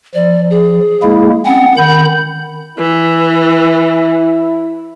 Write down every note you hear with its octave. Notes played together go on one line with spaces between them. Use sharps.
F3 D5
G#4
G#3 A#3 E4
C4 C#4 F#5
D#3 B5 G6
E3 E4